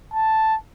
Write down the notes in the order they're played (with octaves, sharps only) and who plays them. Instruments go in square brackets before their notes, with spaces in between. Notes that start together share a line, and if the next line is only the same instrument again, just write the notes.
[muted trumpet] A5